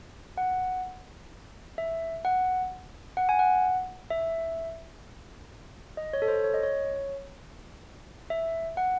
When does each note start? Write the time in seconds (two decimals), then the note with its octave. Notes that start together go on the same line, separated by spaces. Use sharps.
0.38 F#5
1.78 E5
2.25 F#5
3.17 F#5
3.29 G#5
3.39 F#5
4.10 E5
5.97 D#5
6.13 C#5
6.22 A4
6.28 C5
6.44 C#5
6.54 D#5
6.63 C#5
8.30 E5
8.77 F#5